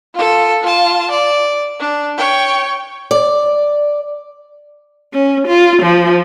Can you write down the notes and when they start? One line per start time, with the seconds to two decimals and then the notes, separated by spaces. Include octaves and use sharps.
0.14 F4 A4
0.62 F4 A5
1.10 D5
1.80 D4
2.17 C#5 G5
3.11 D5
5.13 C#4
5.47 F4
5.83 F3